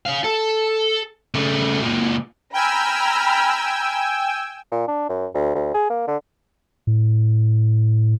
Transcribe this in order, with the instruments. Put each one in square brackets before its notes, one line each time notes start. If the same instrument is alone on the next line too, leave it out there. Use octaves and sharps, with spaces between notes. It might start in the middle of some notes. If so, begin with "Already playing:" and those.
[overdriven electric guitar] C#5 F5
A4
C#3 A3
C#2 A#2
[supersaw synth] G5 G#5 E6 [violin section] A#5 B5 F6
[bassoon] A#2
D4
F#2
D2
D2
G#4
A#3
D3
[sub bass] A2